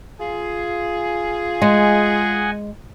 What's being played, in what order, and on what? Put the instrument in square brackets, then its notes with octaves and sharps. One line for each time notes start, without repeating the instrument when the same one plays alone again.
[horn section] F4 G#4
[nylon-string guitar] G#3 [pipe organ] D#5 F#5 G#5